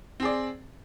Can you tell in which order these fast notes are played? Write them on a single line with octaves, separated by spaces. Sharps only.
C4 G#4 D5